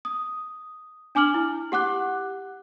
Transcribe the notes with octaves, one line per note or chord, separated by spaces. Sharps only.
D#6
D4 G#5 D6 F6 F#7
E4
G4 F#5 D6 F#6